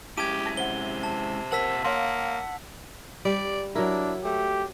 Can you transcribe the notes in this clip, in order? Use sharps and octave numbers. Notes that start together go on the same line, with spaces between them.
G#3 C#4 E4 G4 A5 G#6 D#7
A5 A#6 B6
C3 C5 F#5 G7
A5
A#2 A#4 C5 F#5 A5 E6 B6
A#3 C#5 F5 F#5 C6
G3 D5
F#3 D4 E4 A#4
A3 G4